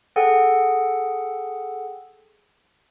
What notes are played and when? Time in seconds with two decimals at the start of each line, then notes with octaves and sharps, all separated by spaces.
0.16 G#4 A4 F#5 G5